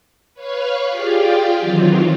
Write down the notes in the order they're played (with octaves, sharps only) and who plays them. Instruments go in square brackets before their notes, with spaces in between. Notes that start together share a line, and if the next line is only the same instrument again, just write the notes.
[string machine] B4 C#5 F5 B5 C#6
F4 G4 G#4 D5 F5 G5
D#3 E3 F#3 C4 F4